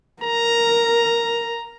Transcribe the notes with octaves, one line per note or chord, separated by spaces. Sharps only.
A#4 A#5